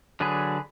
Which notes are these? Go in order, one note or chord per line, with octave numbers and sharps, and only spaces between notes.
D3 F#3 D4 G#4 B4